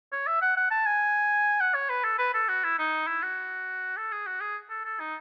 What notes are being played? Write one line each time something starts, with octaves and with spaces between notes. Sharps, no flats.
C#5
E5
F#5
F#5
A5
G#5
F#5
C#5
B4
A4
B4
A4
F#4
E4
D#4
E4
F#4
A4
G#4
F#4
G#4
A4
A4
D#4